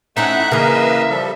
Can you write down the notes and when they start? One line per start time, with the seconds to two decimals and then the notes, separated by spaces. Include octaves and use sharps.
0.17 A3 C4 C#4 D#4 E4 E5 F#5 F#6
0.51 C#3 E3 A#3 B4 D#5 F5
1.10 F3 G3 A4